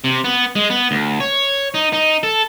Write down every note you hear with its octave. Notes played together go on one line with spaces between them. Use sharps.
C3
B3
G#3
B3
D2
C#5
D#4
D#4
A4